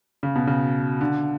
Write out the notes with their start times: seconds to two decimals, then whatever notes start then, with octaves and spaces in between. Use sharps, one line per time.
0.23 C#3
0.35 B2
0.47 C#3
1.01 D3